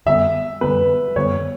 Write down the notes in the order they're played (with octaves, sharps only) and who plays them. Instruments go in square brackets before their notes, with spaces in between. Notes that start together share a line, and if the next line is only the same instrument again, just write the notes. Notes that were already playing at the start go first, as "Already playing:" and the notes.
[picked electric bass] F#2 D3 G3 B3 [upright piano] E5
[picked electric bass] F#2 D3 G3 B3 [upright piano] B4
[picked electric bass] F#2 D3 G3 B3 [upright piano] C#5